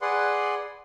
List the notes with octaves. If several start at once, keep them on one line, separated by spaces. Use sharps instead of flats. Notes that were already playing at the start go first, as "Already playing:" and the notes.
G#4 B4 D5 F#5 C6